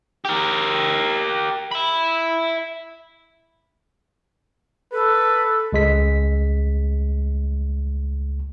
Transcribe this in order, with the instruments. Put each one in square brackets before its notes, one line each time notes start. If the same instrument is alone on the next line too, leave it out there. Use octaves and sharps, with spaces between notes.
[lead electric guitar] G4 A#4
E5 B5
[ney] A4 [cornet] B4
[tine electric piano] C#2 G#3 B6